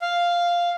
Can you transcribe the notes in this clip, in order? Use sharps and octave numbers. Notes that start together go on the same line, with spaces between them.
F5